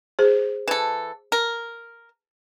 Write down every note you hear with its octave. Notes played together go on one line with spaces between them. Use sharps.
G#4 C5
E3 A4
A#4